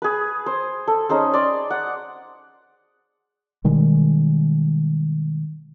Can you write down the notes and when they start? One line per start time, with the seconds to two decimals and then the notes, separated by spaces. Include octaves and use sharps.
0.02 G#4 B4
0.46 C5
0.88 A4
1.09 C#4 D#4 G#4 C5
1.34 D5 C6
1.70 F#5
3.64 B2 D#3 G3 G#3